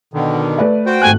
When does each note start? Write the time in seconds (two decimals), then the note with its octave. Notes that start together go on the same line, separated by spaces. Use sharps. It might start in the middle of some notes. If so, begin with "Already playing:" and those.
0.14 B2 D3 D#3
0.58 A3 B4 D5
0.86 F#4 C5 G5
1.02 G#1 A3 G#5 F#6